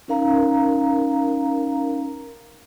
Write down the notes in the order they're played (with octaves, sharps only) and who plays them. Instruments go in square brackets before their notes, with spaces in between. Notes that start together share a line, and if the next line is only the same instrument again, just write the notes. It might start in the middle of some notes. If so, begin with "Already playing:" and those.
[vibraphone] C#4 D#4 A#4 F5 A#5